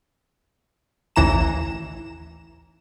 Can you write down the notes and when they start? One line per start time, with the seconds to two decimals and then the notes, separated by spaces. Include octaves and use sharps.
1.16 A1 D#2 E3 A#5 E7